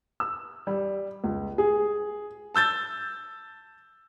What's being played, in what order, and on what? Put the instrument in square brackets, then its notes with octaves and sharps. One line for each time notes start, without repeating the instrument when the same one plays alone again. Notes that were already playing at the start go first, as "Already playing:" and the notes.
[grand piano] E6
G3
C#2
G#4
A5 E6 G6 A6